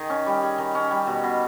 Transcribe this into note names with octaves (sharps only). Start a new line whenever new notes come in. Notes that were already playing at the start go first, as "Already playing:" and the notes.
Already playing: D#3 G#4
C#4
G3
G#4
D#3
C#4
G3
B2
B2